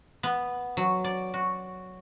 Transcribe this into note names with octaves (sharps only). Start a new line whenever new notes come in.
B3
F#3
D5
F#4